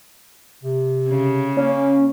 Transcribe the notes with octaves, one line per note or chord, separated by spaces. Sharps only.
C3
C#3
A#3 C#4